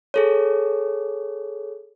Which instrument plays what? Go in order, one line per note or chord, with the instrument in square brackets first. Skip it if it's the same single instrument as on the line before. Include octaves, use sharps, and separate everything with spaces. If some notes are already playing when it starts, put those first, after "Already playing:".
[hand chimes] G#4 A4 C#5